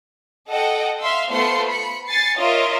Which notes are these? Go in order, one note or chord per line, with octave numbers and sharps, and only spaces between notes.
A4 D#5 F#5 G5
E5 F5 C6 E6
A3 B3 F4 C5 C6 C#7
B5 C#7
G#5 A6 C7 C#7
F4 A#4 C#5 D#5 E5